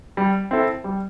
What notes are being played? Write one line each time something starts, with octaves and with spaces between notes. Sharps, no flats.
G3
C4 E4 A4
G3